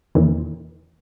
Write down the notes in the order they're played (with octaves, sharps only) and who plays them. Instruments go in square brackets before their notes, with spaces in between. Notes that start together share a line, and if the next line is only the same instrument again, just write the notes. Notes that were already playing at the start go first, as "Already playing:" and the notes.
[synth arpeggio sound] E2 A#2 D#3 E3